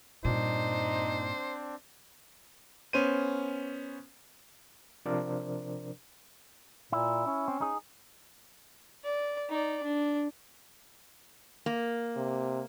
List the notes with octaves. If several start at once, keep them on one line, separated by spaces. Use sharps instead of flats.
G2 A#2 C4 D4 D#4 C5
B3 C#4 C5 D#7
C3 F3 D4 A#4 C5 D5
A#2 E4
C#4
C4
D#4 G#4
D5
D#4 D5
D4
A#3
C3